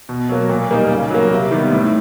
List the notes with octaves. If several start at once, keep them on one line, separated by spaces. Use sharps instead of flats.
B2
F#3 A#3
A#2
G3 A#3 D#4
C#3
F#3 A#3
C3
D#3 G3 B3
A2